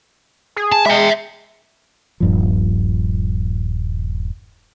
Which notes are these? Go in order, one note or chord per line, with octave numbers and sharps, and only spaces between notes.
G#4
A5
G#3 E5 G5
D#1 G2 F3